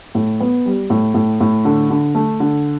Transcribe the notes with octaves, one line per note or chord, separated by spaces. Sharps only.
A2
B3
G3
A2
A2
A2
D3
D3
A3
D3